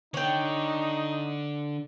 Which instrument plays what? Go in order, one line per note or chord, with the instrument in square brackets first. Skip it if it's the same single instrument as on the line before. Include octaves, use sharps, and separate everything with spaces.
[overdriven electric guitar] D3 [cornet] D#4 [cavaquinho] C#5 G5